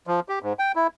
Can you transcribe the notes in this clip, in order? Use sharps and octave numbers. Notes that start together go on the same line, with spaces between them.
F3
G4
G#2
G5
E4